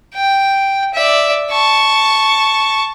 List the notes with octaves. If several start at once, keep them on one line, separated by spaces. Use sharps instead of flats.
G5
D5 E5
A5 C#6